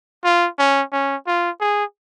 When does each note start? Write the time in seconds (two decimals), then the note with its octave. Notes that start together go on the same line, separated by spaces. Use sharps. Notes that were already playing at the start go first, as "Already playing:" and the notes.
0.24 F4
0.58 C#4
0.92 C#4
1.27 F4
1.61 G#4